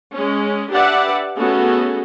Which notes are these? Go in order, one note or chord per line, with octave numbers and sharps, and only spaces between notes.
G#3 C#4
D4 G4 B4 D5 E5 F#5
A3 B3 C#4 F#4 G#4 A4